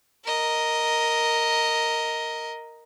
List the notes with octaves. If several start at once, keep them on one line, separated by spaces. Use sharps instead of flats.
A#4 D#5